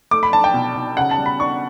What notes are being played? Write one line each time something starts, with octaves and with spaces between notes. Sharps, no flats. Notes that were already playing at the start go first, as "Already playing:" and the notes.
A3 D6
B5
D4 A5
G5
B2
B2
C#3 F#5
A5
G3
B5
D4 C#6